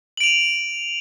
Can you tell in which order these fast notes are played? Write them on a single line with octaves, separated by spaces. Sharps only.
F#7 D7 F7 D#7